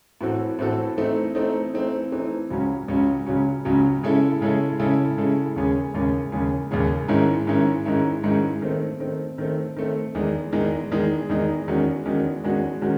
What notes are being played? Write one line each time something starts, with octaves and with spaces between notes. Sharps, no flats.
A2 E3 C4 F#4 A4
A2 E3 C4 F#4 A4
E3 A3 C4 D#4
E3 A3 C4 D#4
E3 A3 C4 D#4
E3 A3 C4 D#4
C#2 C#3 F#3 C#4
C#2 C#3 F#3 C#4
C#2 C#3 F#3 C#4
C#2 C#3 F#3 C#4
C#3 G#3 C#4 E4 A4
C#3 G#3 C#4 E4 A4
C#3 G#3 C#4 E4 A4
C#3 G#3 C#4 E4 A4
D#2 C#3 G#3 C#4 G#4
D#2 C#3 G#3 C#4 G#4
D#2 C#3 G#3 C#4 G#4
D#2 C#3 G#3 C#4 G#4
G#2 D#3 G#3 C#4 E4
G#2 D#3 G#3 C#4 E4
G#2 D#3 G#3 C#4 E4
G#2 D#3 G#3 C#4 E4
D#3 A3 C4
D#3 A3 C4
D#3 A3 C4
D#3 A3 C4
E2 D#3 G#3 D#4
E2 D#3 G#3 D#4
E2 D#3 G#3 D#4
E2 D#3 G#3 D#4
E2 D#3 G#3 C#4 F#4
E2 D#3 G#3 C#4 F#4
E2 D#3 G#3 C#4 F#4
D#3 G#3 C#4 F#4